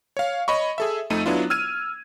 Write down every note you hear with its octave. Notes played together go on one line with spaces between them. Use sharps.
C#5 F5
C#5 D#5 B5 C#6
G#4 A4 E5
F2 A3 D#4 D#7
F#3 B3 D4 E4 F4
E6 F6 G#6 D#7